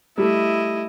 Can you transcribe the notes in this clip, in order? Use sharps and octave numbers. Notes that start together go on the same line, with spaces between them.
G3 A3 E4 D#5